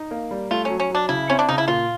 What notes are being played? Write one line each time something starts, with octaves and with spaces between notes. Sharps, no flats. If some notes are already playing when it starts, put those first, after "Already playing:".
Already playing: D#4
A#3
G3
A3 F4
F#3 C#4
C#4
F#3 D4
C#3 E4
C4 C#4
D4
C#3 D#4
E4
A#2 F4